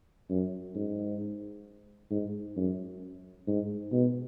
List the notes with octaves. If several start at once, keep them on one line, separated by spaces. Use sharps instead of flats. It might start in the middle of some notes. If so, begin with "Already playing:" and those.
F#2
G#2
G#2
F#2
G#2
B2